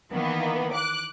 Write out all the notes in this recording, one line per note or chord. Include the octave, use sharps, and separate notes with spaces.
D#3 E3 A#3 B3
D6 F#6